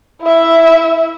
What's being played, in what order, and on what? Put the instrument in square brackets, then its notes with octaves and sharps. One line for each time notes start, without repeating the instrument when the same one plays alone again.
[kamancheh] E4 E5